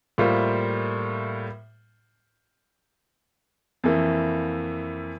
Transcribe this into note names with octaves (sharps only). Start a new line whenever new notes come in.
A2 G3 A#3 F4 C5
F2 E3 A#3 E4